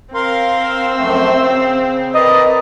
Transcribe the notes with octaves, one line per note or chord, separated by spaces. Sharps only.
C4 A#4 F5 C6
C5 E6
F#2 F3 A3
C#3
A#4 B4 D5 D#5 A#5